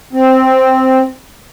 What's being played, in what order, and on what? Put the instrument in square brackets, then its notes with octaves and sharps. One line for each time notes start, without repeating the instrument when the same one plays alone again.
[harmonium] C4